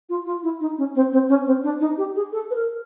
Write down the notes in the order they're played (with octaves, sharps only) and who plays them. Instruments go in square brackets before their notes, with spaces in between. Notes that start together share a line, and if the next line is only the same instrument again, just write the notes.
[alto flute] F4
F4
E4
D#4
C#4
C4
C4
C#4
C4
D4
D#4
G4
G#4
A4
B4
A#4